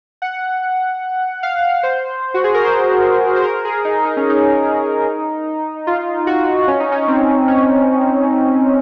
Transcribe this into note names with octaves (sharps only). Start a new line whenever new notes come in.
F#5
F5
C5
F#4
G#4
A#4
C5
C5
A#4
G#4
D#4
D#4
C#4
D#4
F4
F#4
C#4
D#4
C#4
C4
C#4